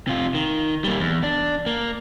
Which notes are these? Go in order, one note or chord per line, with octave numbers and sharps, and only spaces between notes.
C3 F4
D#3
G3 A#3
E2
D4
A#3